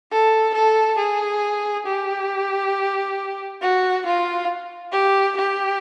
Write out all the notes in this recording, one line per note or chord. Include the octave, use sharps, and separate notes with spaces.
A4
A4
G#4
G4
F#4
F4
G4
G4